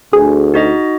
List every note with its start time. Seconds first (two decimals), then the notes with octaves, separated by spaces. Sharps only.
0.13 D2 G#4
0.54 D#4 F#4 D#5